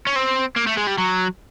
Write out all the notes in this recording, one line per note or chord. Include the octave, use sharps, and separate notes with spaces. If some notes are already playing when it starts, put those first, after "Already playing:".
C#4
C4
A#3
A3
G#3
G3
F#3